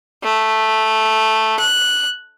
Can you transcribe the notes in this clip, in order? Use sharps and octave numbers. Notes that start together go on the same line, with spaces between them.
A3
F#6